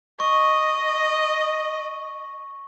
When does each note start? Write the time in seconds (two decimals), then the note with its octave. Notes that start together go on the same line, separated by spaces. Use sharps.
0.20 D#5 C#6